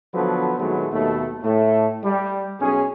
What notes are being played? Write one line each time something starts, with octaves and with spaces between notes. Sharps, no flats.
D3 F3 F#3 B3 A4 B4
A#2 D#3 F#3 G#3 A3 B3
D#2 B2 A3
A2 A3
G3
B1 C#4 G#4